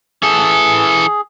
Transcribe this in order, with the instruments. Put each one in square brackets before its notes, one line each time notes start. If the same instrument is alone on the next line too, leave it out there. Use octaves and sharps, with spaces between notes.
[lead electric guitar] E3 A4 [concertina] G#4